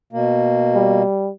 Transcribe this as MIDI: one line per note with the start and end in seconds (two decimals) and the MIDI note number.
0.13 1.03 47
0.13 1.03 58
0.75 1.31 55